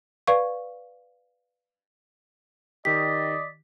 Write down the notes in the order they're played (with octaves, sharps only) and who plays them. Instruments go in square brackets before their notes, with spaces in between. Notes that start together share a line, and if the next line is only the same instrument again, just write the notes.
[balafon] B4 D5 F5 C#6
[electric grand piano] D#3 G4 [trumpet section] D5 D#5 [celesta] B6